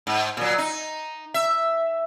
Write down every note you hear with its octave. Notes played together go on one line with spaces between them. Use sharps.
G#2
A#2 F#3
D#4
E5